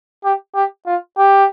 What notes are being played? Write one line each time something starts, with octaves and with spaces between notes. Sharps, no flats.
G4
G4
F4
G4